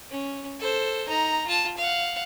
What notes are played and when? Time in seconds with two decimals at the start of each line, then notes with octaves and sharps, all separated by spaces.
0.11 C#4
0.60 A4 C5
1.09 D#4 A#5
1.47 F4 A5
1.77 F5 F#5